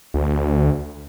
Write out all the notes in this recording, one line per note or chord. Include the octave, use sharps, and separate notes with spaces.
D2